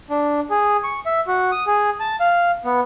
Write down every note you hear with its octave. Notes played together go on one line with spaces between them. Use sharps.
D4
G#4
C#6
E5
F#4
D#6
G#4
A5
F5
B3